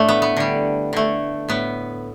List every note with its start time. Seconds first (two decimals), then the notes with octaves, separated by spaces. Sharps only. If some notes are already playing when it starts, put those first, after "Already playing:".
Already playing: A2 A3 D4 E4 A4
0.09 B3
0.22 B3
0.37 D3 G3
0.93 D3 A3
1.49 A2 B3